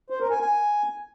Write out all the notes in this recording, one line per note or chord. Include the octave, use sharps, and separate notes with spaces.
C5
A#4
G#5
G#5